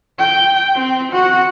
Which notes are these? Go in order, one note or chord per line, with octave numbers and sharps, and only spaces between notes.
G5
C4
F#4 F#5